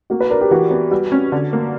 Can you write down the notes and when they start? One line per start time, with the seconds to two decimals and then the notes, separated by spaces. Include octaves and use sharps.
0.10 A#3 F#4
0.21 B4
0.30 D4 A#4
0.41 G4
0.51 E3 F#4
0.71 B3
0.91 G3 F#4
1.12 C#4
1.32 D3
1.53 A#3